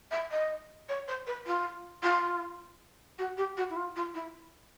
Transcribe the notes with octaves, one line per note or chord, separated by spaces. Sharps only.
E5
D#5
C#5
C5
B4
F4
F4
F#4
G4
F#4
E4
F4
F4
E4